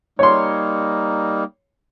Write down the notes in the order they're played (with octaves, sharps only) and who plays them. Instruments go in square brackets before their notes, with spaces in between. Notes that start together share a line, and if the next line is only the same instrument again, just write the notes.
[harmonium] G3 A#3 D#4 [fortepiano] C#5 C6